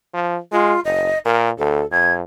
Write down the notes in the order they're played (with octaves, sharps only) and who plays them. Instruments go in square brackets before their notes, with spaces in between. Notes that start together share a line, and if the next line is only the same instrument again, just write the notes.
[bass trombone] F3
[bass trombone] G#3 [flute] F4
[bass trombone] F#1 [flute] D#5
[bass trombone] A#2 [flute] A#4
[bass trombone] D2 [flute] A4
[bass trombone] F2 [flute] G#6